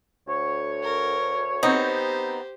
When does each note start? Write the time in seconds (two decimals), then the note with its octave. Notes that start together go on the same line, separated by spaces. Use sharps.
0.28 D2 C#5
0.83 A#4
1.63 B3 C4 D#4 G4 C5